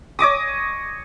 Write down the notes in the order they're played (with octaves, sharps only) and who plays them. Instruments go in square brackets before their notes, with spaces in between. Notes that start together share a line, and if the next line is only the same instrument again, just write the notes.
[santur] C#5 D#5 D6 D#6